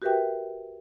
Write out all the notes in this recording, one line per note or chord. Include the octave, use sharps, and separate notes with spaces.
F#4 G4 A#4 B4 E5 G5